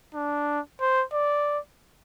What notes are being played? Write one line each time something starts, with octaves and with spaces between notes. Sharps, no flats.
D4
C5
D5